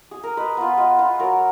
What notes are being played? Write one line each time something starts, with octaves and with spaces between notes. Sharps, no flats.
G#4
A#4
G#3 B4
B3 F4
G#3
B3 F4
F#3 A#4